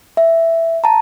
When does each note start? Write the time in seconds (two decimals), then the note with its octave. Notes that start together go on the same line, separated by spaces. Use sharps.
0.17 E5
0.84 A5 A#5